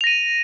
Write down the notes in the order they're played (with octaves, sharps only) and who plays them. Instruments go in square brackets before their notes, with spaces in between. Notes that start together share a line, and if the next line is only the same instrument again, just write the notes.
[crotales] F7
A#6
D#7